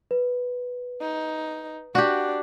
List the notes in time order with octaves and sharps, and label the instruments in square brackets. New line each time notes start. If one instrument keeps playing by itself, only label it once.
[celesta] B4
[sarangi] D#4
[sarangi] D4 [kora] F#4 G4